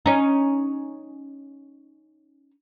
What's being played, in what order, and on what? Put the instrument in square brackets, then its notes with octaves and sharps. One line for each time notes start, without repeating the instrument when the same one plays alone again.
[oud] C#4 D#4